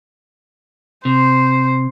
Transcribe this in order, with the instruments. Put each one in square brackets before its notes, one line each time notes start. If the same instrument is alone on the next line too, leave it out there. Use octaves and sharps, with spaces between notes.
[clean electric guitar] C3 [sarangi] C5